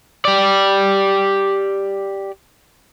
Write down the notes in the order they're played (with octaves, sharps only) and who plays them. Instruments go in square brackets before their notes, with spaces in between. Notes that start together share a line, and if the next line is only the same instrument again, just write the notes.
[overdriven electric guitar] G4 D5